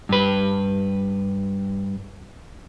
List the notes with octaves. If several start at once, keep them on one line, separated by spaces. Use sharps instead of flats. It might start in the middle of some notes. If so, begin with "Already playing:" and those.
G2 B4